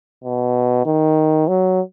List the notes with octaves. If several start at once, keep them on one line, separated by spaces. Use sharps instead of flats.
B2
D#3
F#3